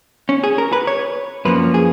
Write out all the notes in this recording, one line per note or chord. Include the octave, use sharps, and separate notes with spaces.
C#4
G#4
A#4
B4
C#5
F#2 F3 A#3 C#4 B4
G#4